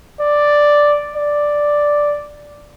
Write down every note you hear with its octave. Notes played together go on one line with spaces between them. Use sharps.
D5
D5